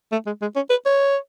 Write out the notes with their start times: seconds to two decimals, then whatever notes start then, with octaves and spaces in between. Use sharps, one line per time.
0.12 A3
0.26 G#3
0.42 G#3
0.56 C#4
0.70 B4
0.86 C#5